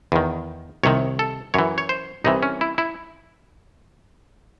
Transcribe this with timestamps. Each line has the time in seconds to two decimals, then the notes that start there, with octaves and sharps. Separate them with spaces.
0.12 E2 D#3
0.83 C2 C3 D#3 C#5
1.19 A4
1.54 F#2 E3 C#5
1.78 C#5
1.89 C5
2.24 C2 C3 E3 D#4
2.43 C#4
2.61 E4
2.78 E4